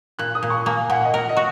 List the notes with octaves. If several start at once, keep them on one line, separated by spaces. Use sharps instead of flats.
A#2 F#6
D#6
A#2
C#6
A#3 G#5
A#2 F#5
D#5
A#4 F#5
D#5
F#4